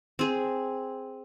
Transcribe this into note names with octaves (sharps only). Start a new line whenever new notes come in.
C4 G#4